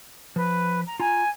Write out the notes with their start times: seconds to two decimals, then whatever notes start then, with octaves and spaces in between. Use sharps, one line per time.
0.36 F3 B4
0.86 A#5
1.00 F4 G#5 A#5